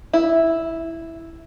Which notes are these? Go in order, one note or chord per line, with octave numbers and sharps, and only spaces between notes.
E4